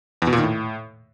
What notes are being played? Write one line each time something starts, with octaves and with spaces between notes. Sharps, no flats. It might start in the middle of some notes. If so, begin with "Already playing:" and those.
E2
B2
A#2
D#3
A2